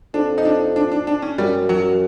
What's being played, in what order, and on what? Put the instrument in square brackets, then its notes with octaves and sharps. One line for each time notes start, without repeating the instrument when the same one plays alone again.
[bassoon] F2 [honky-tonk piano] D4
[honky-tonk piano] D#4
D4
D4
D4
D4
C#4
[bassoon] F#2 [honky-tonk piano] G3
[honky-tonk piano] F#3